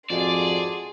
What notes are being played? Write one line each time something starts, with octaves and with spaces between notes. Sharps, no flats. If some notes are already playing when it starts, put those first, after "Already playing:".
F2 G#2 F3 F#4 G#4 D5 C6